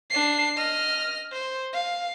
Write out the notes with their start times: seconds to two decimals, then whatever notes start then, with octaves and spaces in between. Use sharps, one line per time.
0.10 D4 C7
0.57 D#5 F6
1.32 C5
1.73 F5